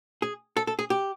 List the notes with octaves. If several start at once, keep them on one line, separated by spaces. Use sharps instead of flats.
G#4
A4
A4
G#4
G4